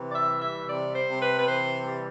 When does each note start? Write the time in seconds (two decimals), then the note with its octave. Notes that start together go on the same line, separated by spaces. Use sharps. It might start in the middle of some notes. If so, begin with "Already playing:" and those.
Already playing: C3 E3
0.10 D5
0.15 E5
0.27 G3
0.41 E5
0.67 C3 D5
0.94 C5
1.07 C3
1.20 B4
1.37 B4
1.46 E3 C5
1.86 G3